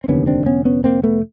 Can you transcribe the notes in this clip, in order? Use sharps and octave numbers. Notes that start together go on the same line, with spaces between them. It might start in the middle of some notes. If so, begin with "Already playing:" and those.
C4
F1 D#2 D3 B3 C#4
C4 D4
B3 C#4
B3 C#4
A#3 C4
A3 B3